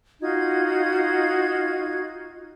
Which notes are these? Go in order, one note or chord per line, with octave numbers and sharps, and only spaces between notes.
D#4 F4 F#4 G#6